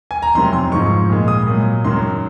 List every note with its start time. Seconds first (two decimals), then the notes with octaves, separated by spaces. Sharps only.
0.11 G#5
0.22 A#5
0.35 F2 C3 D#3 F#3 C6
0.53 C6
0.72 G#2 F3 G#3 C#6
1.10 A#2 G#3
1.28 D#6
1.47 A#2 F#3
1.85 F#2 D#3 F#3 C6